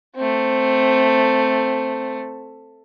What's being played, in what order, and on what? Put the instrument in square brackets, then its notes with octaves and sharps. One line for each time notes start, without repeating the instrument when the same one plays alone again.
[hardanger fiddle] A3 C4